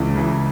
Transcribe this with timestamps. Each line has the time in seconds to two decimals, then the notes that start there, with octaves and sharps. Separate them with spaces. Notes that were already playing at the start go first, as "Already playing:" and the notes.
Already playing: C#2 C#3 E3
0.15 C#2 C#3 E3